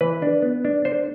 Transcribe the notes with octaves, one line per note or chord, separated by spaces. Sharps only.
E3 B4
D4
B3
D4
D4 C5